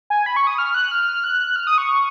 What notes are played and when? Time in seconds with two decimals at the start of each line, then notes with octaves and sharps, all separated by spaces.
0.10 G#5
0.26 B5
0.36 C#6
0.47 D#6
0.59 F6
0.74 F#6
0.92 F6
1.24 F#6
1.56 F6
1.67 D#6
1.78 C#6